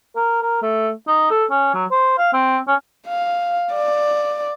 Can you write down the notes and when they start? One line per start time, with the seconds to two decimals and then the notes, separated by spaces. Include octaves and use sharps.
0.16 A#4
0.42 A#4
0.62 A3
1.08 D#4
1.30 A4
1.50 C#4
1.74 F#3
1.91 C5
2.18 F5
2.33 C4
2.67 C#4
3.07 F5
3.73 D5